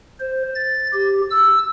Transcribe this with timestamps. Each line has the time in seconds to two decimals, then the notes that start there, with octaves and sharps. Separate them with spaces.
0.20 C5
0.55 A6
0.93 G4
1.31 E6